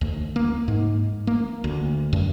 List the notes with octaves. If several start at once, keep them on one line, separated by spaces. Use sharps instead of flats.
D2
A#3
G#2
A#3
D2
F#2